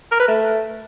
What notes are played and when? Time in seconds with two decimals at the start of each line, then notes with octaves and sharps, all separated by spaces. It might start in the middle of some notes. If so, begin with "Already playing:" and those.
0.12 A#4
0.20 B4
0.28 A3